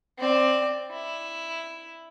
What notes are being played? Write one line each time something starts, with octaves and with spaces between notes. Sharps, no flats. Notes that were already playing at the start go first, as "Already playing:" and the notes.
C4 D5
E4